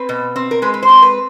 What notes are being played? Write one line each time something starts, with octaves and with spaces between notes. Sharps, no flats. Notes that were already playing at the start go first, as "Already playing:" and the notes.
Already playing: C4 B4
B2
C4
A#4
G#3 B4
B4
C5
C4
B4